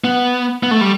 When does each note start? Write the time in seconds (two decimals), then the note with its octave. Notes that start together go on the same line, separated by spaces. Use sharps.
0.04 B3
0.63 B3
0.71 A3
0.81 G3